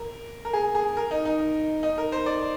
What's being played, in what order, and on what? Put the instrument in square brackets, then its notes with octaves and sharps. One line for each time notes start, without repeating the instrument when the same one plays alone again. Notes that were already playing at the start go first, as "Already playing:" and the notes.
Already playing: [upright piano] A#4
A#4
G#4
G#4
A#4
D#4
D#4
D#4
A#4
C5
D5